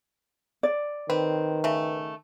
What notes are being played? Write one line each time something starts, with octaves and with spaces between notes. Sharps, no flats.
D5
D#3 C4 B4
C#3 A3